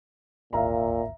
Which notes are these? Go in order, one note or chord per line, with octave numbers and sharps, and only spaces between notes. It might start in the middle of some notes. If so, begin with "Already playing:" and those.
D1 G#1 D#2 A#2 E5 F5 A#5